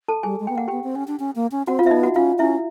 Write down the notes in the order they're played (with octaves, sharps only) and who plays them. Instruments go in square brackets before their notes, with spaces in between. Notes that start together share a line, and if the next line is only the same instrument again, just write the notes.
[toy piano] A4 A5
[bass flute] G3 [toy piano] G#4 G#5
[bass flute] G#3
[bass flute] B3 [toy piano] G5
[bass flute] A#3 [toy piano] F#5
[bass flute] B3 [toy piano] G4 G5
[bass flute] C4
C#4
D4
C#4
A#3
C#4
[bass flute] C4 [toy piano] F#4 F#5
[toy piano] F4 F5
[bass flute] C4 [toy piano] E5
[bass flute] B3 [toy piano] D#4 D#5
[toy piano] F#4 F#5
[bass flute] C#4 [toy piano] F4 F5
[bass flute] C#4 [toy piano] E4 E5